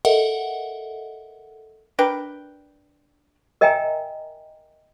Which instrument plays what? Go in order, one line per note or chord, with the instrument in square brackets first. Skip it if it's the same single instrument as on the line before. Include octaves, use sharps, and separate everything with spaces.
[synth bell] A4 A#4 D#5 E5 F#5
[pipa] D4 A#4 B4 G5
[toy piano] A#4 D#5 E5 G5 G#5 A#5